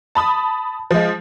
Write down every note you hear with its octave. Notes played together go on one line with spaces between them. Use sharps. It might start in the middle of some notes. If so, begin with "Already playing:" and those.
A5 B5 D#6
F3 G#3